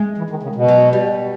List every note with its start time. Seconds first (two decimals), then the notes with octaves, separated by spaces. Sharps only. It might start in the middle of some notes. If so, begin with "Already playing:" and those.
Already playing: G#3
0.18 E3
0.30 D#3
0.43 C#3
0.55 B2
0.68 F#3
0.93 G3